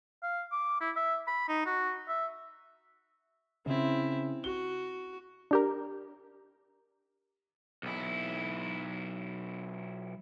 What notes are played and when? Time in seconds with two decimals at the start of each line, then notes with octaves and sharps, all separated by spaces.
0.22 F5
0.52 D6
0.81 E4
0.96 E5
1.27 B5
1.48 D#4
1.66 F#4
2.09 E5
3.66 C#3 C4 E4
4.44 F#4 G7
5.51 D4 G4 A#4
7.83 B1 E4